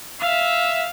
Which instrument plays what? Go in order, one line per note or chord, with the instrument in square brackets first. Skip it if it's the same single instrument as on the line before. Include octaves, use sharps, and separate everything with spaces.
[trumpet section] E5 [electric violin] F5